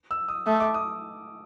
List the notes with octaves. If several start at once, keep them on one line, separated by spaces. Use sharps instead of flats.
E6
D#6
A3 D#6
D6
D#6